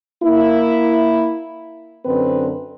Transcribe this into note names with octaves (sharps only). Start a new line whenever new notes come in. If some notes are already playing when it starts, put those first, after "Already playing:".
A#3 E4
F#2 D3 C4 B4